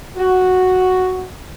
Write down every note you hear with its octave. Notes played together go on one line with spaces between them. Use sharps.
F#4